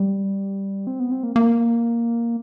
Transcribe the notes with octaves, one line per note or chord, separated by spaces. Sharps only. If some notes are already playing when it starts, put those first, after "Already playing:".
Already playing: G3
C4
B3
C4
A#3
A#3